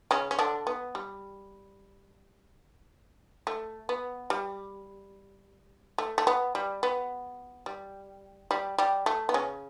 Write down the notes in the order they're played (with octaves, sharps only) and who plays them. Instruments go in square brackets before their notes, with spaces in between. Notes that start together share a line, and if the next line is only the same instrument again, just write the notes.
[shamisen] C#3 C#4
C#4
D3 D4
B3
G3
A3
B3
G3
A3
A3
B3
G3
B3
G3
G3
G3
A3
B3
C#3 C#4